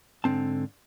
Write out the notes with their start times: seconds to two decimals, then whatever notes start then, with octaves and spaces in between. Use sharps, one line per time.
0.24 G#2 D3 C4 A5